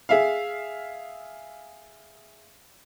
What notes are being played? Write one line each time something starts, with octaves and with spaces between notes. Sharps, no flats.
G#4 E5 F5